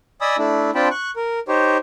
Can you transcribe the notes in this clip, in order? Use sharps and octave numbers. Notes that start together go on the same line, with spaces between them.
D5 D#5 G#5 B5 D#6 E6
A3 D4 E4
C4 D4 F4 G5 A5 B5
C#6 F#6
A#4
D#4 G4 C5 C#5